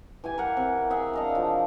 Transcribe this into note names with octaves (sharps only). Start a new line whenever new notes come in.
E3 G4 G#5
A#4 F#5 G5
C3
G#4 E5 F#5
D4 D#5 F5
F3